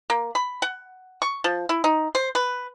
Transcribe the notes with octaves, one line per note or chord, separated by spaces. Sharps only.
A#3
B5
F#5
C#6
F3
E4
D#4
C5
B4